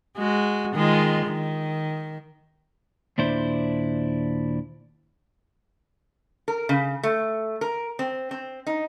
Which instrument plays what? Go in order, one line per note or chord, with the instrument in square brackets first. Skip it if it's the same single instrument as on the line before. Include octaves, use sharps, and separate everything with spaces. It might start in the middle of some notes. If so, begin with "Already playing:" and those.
[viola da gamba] G#3 F#4
D#3 G#3 F4
D#3
[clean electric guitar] D#2 A#2 D4 E4 C5
[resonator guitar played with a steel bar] A#4
C#3
A3
A#4
C4
C4
D#4